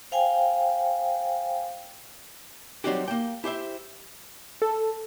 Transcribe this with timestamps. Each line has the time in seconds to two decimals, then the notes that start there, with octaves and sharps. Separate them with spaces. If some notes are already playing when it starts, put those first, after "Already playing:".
0.12 C5 F5 G5 G#5
2.84 F#3 G3 C4 D#4 F#4 G4
3.08 A#3 G5
3.44 E4 G4 C5 E5
4.62 A4